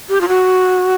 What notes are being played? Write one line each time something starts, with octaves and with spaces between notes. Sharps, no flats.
G4
F4
F#4